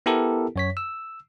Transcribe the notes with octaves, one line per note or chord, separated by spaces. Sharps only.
B3 E4 G4 A4 A#4
F#2 C#5 B6
E6